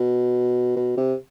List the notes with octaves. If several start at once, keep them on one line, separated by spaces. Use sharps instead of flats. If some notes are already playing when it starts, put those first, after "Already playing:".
Already playing: B2
B2
C3